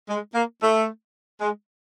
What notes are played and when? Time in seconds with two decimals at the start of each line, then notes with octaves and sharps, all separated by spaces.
0.09 G#3
0.35 A#3
0.61 A3
1.41 G#3